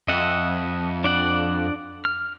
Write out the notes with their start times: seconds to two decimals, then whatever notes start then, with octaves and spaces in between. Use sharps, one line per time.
0.08 F2 D#5 E5 F#5
1.04 D4 D5 F#5
2.05 F6